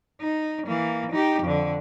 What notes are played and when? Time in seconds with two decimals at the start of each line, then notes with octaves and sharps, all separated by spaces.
0.21 D#4
0.67 E3 A#3
1.12 D#4 G4
1.43 F2 D3